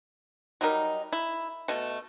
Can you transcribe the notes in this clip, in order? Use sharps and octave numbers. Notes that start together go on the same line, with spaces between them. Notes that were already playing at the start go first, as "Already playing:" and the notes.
F#3 G3 D#4 A#4
E4
B2 A3